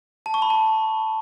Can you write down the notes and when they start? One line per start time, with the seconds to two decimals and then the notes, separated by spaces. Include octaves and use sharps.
0.26 A5
0.34 C#6
0.42 B5
0.50 A5